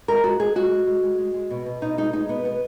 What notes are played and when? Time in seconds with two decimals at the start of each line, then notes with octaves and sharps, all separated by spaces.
0.08 G#3 A#4
0.24 G#3 F#4
0.40 G#3 G#4
0.55 G#3 F#4
0.71 G#3
0.87 G#3
1.03 G#3
1.18 G#3
1.34 G#3
1.50 B2
1.66 B2
1.82 B2 D#4
1.98 G#3 D#4
2.13 G#3 D#4
2.29 B2 B3
2.45 G#3 B3